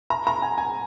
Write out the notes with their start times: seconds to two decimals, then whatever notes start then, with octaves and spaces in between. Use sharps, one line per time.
0.10 A#5
0.27 A#5
0.42 G#5
0.58 G#5